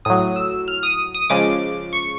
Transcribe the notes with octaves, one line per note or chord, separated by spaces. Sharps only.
A2 F#3 D#6
E6
F6
D#6
D#6
C#3 F3 G#3 D6
C#6